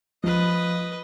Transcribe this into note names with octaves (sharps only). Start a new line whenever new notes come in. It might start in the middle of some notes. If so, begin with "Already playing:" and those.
F3 B4 D#5